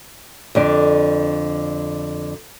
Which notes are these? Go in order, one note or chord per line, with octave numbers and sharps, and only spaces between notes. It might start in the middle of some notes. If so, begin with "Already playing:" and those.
F2 D3 D5